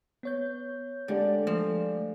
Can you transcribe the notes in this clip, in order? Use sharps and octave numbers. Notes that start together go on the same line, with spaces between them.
B3 C#5 G6
D3 G#3 G4 D5
F3 A3